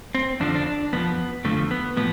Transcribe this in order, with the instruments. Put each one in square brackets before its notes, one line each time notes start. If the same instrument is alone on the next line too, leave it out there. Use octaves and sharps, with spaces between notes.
[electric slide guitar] C4
F2 D3 F3 D4
C4
D4
D4
F2 D3 F3 B3
F2 D3 F3 A3
B3
A2 F3 B3